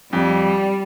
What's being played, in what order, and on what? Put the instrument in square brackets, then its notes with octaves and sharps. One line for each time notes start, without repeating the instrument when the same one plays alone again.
[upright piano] F2 [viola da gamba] G3